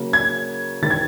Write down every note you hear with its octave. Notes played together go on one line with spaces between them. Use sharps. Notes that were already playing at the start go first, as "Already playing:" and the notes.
Already playing: C#3 F#3 A#3
G#6
E1 D#3 A6
G#6